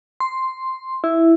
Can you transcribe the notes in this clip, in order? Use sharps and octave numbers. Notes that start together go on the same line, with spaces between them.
C6
E4